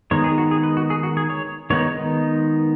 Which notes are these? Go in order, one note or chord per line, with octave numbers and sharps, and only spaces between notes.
D#3 G#3 B3 D#4 C#5
G#4
F#4
G#4
B4
F#4
G#4
F#4
G#4
C#5
D#3 G#3 B3 D#4 C#5